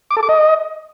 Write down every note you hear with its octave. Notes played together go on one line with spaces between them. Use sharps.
D6
A4
D6
D#5